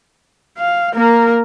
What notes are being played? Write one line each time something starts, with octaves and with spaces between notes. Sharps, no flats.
F5
A#3 A#4